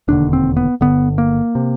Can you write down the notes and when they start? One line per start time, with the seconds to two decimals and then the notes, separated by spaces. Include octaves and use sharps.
0.08 E1 D#2 D3 D4
0.33 C4
0.57 B3
0.81 G1 G2 D3 B3
1.18 A#3
1.55 C3